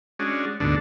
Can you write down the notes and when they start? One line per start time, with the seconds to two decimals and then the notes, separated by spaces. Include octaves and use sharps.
0.19 G#3 C#4 D4 F#4
0.60 D2 G#2 B2 D3 D4